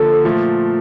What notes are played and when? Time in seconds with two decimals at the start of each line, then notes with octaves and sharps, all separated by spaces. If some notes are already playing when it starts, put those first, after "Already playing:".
Already playing: D3 F3 A#3 A4
0.25 A#2 F3 A3